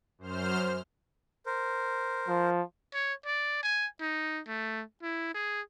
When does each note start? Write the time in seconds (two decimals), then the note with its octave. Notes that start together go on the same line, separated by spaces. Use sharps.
0.18 F#2 C5 F6
1.46 A#4 C5
2.28 F3
2.94 C#5
3.26 D5
3.63 G#5
4.01 D#4
4.47 A3
5.03 E4
5.34 G#4